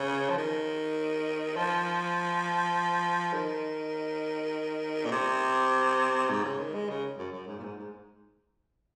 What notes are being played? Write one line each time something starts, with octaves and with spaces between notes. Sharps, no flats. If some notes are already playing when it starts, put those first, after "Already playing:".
Already playing: C#3
F3
D#3
F3
D#3
A#2
C3
G#2
C#3
D#3
G#3
C#3
F#2
F#2
G#2
A#2
G#2
G#2